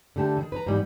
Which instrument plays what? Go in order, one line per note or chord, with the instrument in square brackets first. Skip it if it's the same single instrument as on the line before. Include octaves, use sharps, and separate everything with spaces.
[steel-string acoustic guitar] D3 A3 G4 A5
D#3 E3
B4 A#5
G#2 E3 G3 B3